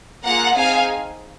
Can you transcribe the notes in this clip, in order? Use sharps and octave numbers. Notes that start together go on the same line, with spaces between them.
A#3 F4 G#4 F#5 A#5
C4 D#4 G#4 F5 G#5